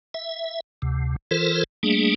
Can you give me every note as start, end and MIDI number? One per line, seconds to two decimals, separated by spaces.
0.14 0.60 76
0.82 1.16 38
0.82 1.16 48
1.31 1.64 52
1.31 1.64 65
1.31 1.64 69
1.31 1.64 70
1.31 1.64 72
1.83 2.14 55
1.83 2.14 57
1.83 2.14 58
1.83 2.14 62
1.83 2.14 68